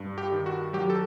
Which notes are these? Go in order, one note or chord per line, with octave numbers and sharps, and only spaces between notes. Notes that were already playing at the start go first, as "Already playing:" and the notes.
Already playing: G2
G4
D#3
F#4
F#3 G4
A4